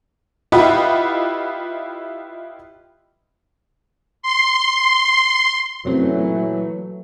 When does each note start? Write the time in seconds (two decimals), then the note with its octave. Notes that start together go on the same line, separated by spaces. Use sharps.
0.52 E4 F4 G4 B4 D#5 F#5
4.23 C6
5.85 F#2 C3 E3 F#3 A3 C4
6.16 A#2